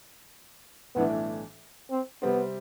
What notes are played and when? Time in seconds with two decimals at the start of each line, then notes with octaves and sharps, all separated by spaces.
0.95 B1 A2 E3 A3 B3 D4
1.91 C4
2.22 C3 G3 B3 C4